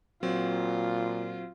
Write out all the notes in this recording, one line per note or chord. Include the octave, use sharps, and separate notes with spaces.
A#2 F#3 C4 F4